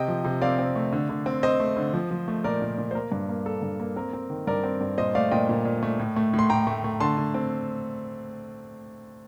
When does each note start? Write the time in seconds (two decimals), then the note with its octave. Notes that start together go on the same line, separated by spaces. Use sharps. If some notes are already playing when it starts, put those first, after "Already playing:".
Already playing: C3 D#5 G5
0.08 F3
0.24 C3
0.42 C4 D5 F5
0.59 C4
0.76 A3
0.93 D3
1.09 D3
1.26 C4
1.43 C4 C5 D#5
1.60 A3
1.77 D3
1.93 F3
2.11 F3
2.28 A3
2.44 A#2 A#4 D5
2.62 A#2
2.78 A#2
2.91 C5
2.95 A#3 A#4
3.12 G2
3.29 A#3
3.46 A#3 A4
3.63 G2
3.80 A#3
3.96 C4 A#4
4.13 C4
4.30 D#3
4.47 G2 A#4 D5
4.64 C4
4.81 G2
4.98 A#2 C5 D#5
5.15 A3 D5 F5
5.31 A#2 D#5 G5
5.49 A#2
5.65 A#2
5.83 A3
5.99 A2
6.16 A3
6.33 A2
6.39 C6
6.50 A2 G5 A#5
6.67 A3
6.84 A3
7.00 D3 A5 C6
7.18 D3
7.34 C4